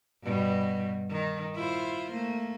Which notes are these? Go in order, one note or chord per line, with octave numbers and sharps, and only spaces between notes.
G2 B2 G3
D#3
E4 F4 C5
A3 A#3